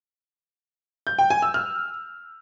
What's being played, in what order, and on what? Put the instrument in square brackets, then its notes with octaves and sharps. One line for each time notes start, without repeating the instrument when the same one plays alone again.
[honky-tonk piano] G6
G5
G#5
E6
F6